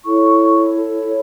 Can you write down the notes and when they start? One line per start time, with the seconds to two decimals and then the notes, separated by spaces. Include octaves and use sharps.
0.04 E4 A4 C#5 C#6